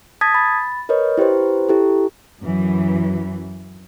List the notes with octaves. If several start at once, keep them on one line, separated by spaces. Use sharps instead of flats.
A5 D#6 G#6 A6 B6
B5 A6
A#4 B4 C#5 D#5
E4 G4 B4 C5
E4 G4 A4
F#2 E3